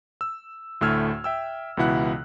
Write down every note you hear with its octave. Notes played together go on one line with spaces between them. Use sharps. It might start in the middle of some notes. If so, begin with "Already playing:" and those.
E6
D2 A2 A3 E6 F6 G#6
E5 G5 E6
C#2 B2 E3 E4 F#5 F#6